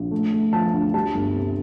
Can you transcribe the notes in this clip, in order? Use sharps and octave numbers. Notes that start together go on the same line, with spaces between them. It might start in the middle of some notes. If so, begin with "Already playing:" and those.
Already playing: A#1
A3
A3
F3 A5
D2
G3 A5
G1
C3